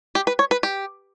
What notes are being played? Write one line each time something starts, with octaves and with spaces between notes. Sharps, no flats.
G4
B4
C#5
B4
G4